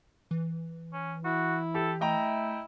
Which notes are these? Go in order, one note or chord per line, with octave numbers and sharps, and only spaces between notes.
E3
C#4
E4 F#4
G4 A4
A3 E4 D#5 G5 A#5